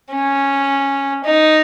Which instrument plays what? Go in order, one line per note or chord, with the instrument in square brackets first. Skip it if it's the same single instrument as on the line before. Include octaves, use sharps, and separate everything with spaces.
[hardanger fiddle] C#4
D#4